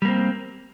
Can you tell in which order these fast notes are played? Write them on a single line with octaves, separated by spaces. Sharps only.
G3 A#3 C4